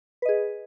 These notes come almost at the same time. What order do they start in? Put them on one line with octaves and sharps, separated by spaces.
B4 D#5 G#4